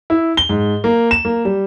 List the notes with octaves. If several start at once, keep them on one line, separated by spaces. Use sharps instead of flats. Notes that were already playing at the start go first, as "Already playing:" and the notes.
E4
G7
G#2
A#3
E7
A#3
G3